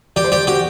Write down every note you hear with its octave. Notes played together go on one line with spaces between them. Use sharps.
G4 D5
C5
G4 D5
F#4 G4